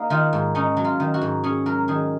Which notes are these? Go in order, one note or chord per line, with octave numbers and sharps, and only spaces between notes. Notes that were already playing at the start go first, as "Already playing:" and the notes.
Already playing: A#3 D#4
D#3 F4
G#2
C#4 D#4
F#3
F4
D#3
F#4
G#2
C#4 G#4
F#3 A#4
D#3 G#4